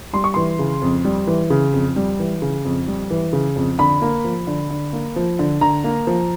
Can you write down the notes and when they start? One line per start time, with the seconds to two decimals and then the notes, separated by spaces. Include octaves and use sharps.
0.13 G3 C6
0.24 C#6
0.34 E3 C6
0.59 C#3
0.82 F2
1.05 G3
1.27 E3
1.50 C#3
1.73 F2
1.96 G3
2.19 E3
2.42 C#3
2.65 F2
2.87 G3
3.10 E3
3.33 C#3
3.56 F2
3.78 D3 B5
4.02 A#3
4.24 F3
4.47 D3
4.70 D3
4.93 A#3
5.16 F3
5.39 D3
5.61 D3 A#5
5.84 A#3
6.07 F3